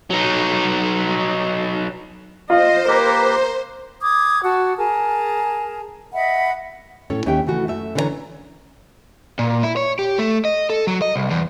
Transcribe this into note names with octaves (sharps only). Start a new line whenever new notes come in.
F#3 D#4
F4 C5 D#5
A#3 G4 A#4 B4
D6 D#6 G#6
F#4 F#5 A5
G#4 A#4 A5
D#5 E5 F#5 B5
A2 C#4 A4 C#5
D#2 C#4 G4 E5 G5
C#3 E3 A3 F#4
F#2 A3 E5
D3 E3 C#4 B4 C#5 A#5
A#2
E4
C#5
G4
A3
D#5
A4
F#3
D#5
C2
E2